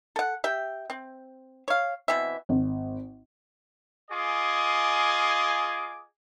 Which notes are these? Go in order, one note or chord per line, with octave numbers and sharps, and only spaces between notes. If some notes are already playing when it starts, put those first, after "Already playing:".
A4 F#5
G4 E5 G5
C4
C#5 F5
B2 E3 C4 E5
G#1
F4 G#4 D#5 G#5 D6